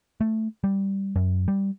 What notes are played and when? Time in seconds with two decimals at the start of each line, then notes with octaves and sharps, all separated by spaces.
0.21 A3
0.64 G3
1.16 F#2
1.48 G3